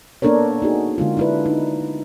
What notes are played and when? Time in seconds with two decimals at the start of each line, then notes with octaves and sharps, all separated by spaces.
0.22 A#3 B3 D4 A4 A#4 C#5
0.62 D#4 F#4 G#4
0.98 D3 G#3 F4
1.17 D4 E4 B4
1.46 D#4